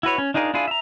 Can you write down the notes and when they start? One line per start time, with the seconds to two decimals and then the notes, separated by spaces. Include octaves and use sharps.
0.03 E4 F#4 B4 C#5
0.18 C#4
0.34 D4 D#4 F4 G#4 A#4
0.54 D4 E4 F4 G#4
0.67 E5 A#5